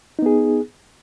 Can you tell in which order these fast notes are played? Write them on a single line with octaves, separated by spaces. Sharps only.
D#4 B3 G#4